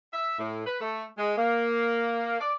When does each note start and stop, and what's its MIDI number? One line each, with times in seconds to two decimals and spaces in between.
0.13 0.36 76
0.39 0.63 45
0.66 0.76 71
0.81 1.04 57
1.18 1.36 56
1.37 2.39 58
2.39 2.53 74